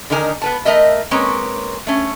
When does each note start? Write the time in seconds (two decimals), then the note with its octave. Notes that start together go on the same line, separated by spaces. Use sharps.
0.10 D3 D#3 D#4 A#4 G#5
0.42 B3 B4 A5
0.65 A3 A#4 D#5 E5
1.11 G#3 A#3 C4 C#4 B4 C#5
1.87 A3 C#4